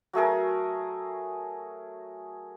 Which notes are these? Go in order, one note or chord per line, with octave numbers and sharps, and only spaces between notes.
F#3 A3 G#4 A#4